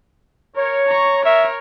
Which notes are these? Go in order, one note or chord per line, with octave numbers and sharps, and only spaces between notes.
A#4 C#5
A#5 C#6
A#4 C#5 E5